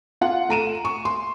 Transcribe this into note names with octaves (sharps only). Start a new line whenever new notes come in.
F4 F#5
A3 A#5 D#7 E7
C#6
C6